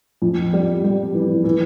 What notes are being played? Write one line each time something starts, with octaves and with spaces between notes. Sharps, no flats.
F2
G3
G3
E3
E3